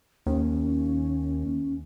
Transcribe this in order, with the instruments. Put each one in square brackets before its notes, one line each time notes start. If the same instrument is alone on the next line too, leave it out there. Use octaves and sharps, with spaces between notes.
[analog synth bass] D#2 [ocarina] C#4